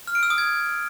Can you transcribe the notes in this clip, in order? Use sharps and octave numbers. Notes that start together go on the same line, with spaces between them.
F6
D7
E6
D#6
G#6